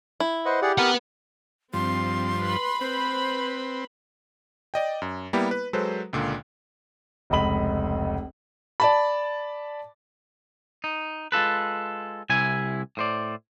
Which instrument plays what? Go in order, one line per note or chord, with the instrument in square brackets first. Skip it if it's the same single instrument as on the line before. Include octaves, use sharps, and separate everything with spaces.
[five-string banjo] E4
[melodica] B4 D#5 F#5 [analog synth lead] C5
[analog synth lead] G4 [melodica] G#4 D5 F#5
[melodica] A#4 A#5 [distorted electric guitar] B4 F#5
[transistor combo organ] G2 F3 [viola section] C4 [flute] C6
[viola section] B4 B5
[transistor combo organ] C4 [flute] C5
[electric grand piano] D5 D#5 G5
F#2
G3 A#3 B3 E4 G4
B4
F#3 G#3 A4 B4 C5
C#2 A#2 D3
[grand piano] F1 C#2 D#5 B5 F#7
[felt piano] D5 A5 B5
[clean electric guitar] D#4
G#3 F4 A4 B4
C2 C3 E4 G#5
A2 C5 D5